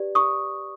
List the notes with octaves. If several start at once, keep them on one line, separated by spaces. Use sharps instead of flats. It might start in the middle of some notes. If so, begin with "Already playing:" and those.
Already playing: G4 B4 D5
C#6 D#6